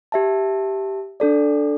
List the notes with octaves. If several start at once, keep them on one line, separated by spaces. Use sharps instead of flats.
G4 E5 A5
D4 A4 D5